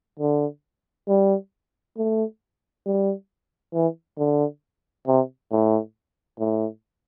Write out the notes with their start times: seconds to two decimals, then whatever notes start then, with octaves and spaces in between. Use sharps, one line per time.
0.19 D3
1.08 G3
1.97 A3
2.86 G3
3.74 E3
4.18 D3
5.07 C3
5.51 A2
6.39 A2